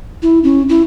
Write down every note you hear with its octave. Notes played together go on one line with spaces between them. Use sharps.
E4
C#4
E4